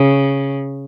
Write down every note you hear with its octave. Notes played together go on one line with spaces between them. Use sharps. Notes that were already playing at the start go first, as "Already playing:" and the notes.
Already playing: C#3